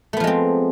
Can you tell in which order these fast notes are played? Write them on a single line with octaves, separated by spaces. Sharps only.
A3 B3 F3 G#3 C4